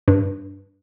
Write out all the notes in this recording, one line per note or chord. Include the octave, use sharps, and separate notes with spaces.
G2